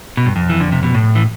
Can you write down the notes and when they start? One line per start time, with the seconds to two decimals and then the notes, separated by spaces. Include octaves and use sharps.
0.17 B2
0.26 G2
0.36 F2
0.49 E3
0.61 D3
0.72 C3
0.83 B2
0.95 A2
1.15 E3